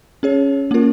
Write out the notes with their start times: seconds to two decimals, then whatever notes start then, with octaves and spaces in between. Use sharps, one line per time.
0.23 C#4 G#4 C#5
0.71 A#3 C#4 F4 A#4